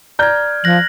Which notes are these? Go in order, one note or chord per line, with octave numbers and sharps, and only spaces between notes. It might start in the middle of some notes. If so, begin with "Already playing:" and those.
D5 A#5 F6 G6 G#6
F3 F#6 A#6 F#7